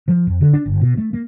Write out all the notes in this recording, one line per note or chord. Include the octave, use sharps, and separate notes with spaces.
F3
F2
D3
D4
G1
B2
A3
A#3